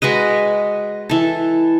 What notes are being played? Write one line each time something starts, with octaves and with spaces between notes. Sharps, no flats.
G#3 F#4 B4 D#5
E3 A4